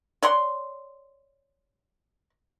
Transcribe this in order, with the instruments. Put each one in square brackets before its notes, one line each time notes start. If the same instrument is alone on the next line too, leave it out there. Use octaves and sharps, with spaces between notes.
[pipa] C#5 D5 F#5 C6